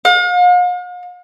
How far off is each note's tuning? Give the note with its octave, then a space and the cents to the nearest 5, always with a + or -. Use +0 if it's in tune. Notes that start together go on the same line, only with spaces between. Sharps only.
F5 +45